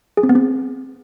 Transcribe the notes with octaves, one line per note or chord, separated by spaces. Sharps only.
G#4
C4
B3
C4